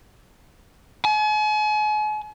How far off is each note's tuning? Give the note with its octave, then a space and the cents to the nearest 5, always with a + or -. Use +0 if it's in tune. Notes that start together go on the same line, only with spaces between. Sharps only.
G#5 +40